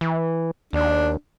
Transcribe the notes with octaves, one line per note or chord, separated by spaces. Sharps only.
E3
D#2 D4